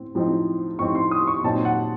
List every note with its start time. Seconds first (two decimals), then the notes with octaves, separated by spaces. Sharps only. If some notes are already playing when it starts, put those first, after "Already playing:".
Already playing: A2 C4
0.15 A2 F3 C4 D#4
0.79 A2 F3 C4 D#4 C#6
0.95 C6
1.11 D#6
1.27 C#6
1.44 A#2 F#3 C4 D#4 A5
1.65 F#5